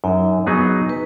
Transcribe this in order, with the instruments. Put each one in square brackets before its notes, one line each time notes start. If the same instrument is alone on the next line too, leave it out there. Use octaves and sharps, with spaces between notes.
[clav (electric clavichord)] F#2 [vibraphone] D#4
[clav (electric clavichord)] F#3 B3 D#4 G#4
[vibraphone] B4